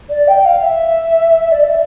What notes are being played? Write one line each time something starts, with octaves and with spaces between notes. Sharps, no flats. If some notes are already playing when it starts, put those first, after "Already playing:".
D5
G5
F5
E5
D5
E5